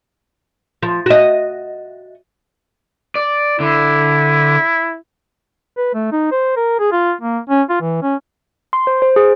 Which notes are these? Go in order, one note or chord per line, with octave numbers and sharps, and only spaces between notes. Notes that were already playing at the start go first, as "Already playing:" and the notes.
F3
F#4 D#5
D5
D3 E4
B4
A3
D#4
C5
A#4
G#4
F4
A#3
C#4
F4
E3
C#4
C6
C5
C5
G#4